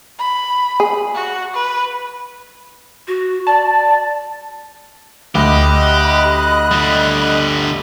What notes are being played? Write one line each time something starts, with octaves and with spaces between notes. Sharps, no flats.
B5
G#4
F#4
B4
F#4
D5 A5
D2 G4 D#5 B5 F#6
D3 G3